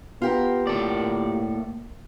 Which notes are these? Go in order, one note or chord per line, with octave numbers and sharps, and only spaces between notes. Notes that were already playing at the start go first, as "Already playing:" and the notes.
B3 F4 G4 A#4
A2 A#3 A4 D5